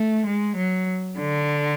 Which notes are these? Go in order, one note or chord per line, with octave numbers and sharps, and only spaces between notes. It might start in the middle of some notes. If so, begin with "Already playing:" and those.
Already playing: A3
G#3
F#3
D3